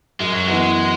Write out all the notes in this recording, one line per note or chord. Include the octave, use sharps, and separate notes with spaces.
F#2 G#3
F#3
E3 G#3 B3 F#4